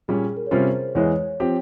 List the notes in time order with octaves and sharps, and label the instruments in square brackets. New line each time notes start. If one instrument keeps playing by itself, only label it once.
[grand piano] A#2 G3 C#4 [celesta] G#4
[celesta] A#4
C#5
[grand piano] C3 G3 C#4 F4 [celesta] C5
[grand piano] E2 E3 G#3 [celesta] C#5
[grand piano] F3 C4 G4